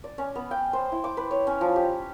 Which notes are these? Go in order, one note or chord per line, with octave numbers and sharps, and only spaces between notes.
D5
C#4
B3
G5
C5
E4
D6
B4
C#5
C#4
F3
G4